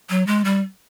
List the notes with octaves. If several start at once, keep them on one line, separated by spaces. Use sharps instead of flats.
F#3
G#3
G3